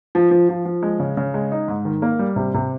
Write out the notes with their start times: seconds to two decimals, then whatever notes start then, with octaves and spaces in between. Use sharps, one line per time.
0.15 F3
0.31 F3
0.49 F3
0.65 F3
0.83 G#3
1.00 C#3
1.17 C#3
1.34 G#3
1.52 D#4
1.68 G#2
1.85 D#3
2.02 A#3
2.19 G3
2.36 C3
2.54 C3